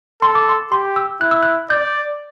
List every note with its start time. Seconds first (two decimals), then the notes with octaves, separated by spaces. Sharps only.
0.22 A4 C6
0.35 D6
0.49 C6
0.72 G4 C6
0.96 E6
1.21 E4 F#6
1.31 E6
1.43 F#6
1.70 D5 G6